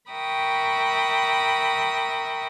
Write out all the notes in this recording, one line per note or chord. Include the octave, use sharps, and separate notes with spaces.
A#4 E5 G5 B5 C#6 D#6